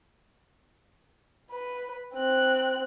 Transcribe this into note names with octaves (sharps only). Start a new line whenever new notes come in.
B4
C4 F#6